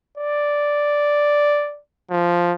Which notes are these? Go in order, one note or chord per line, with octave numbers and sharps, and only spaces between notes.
D5
F3